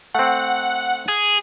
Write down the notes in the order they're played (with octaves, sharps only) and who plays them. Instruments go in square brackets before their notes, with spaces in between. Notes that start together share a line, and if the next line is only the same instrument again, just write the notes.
[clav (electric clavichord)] A3 C4 [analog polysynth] F#5
[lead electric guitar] G#4